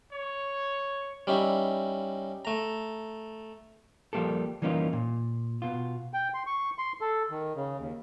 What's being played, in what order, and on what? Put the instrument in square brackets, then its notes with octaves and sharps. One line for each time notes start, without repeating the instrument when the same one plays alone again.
[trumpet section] C#5
[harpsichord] G3 C#4 D#4 E4
A3 A#5
[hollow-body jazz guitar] F3 G3 A#3 G4 A4
E3 G3 A#3 C#4 D#4 F4
A#2
B2 F4
[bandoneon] G5
C6
C#6
C6
A4
D#3
C#3
D#2